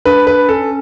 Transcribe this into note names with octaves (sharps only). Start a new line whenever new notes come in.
D4 B4
B4
C#4 A4